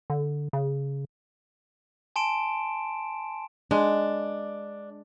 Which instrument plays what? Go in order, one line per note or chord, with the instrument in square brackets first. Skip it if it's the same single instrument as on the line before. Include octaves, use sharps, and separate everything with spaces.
[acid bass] D3
C#3
[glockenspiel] G#5 A5 C6 D7 E7
[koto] G#3 [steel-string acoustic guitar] D4